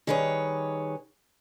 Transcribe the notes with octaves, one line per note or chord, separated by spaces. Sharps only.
D#3 G3 G#4 B4 C#5